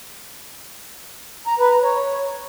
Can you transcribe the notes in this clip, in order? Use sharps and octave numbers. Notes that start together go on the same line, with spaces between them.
A#5
B4
A#5
C#5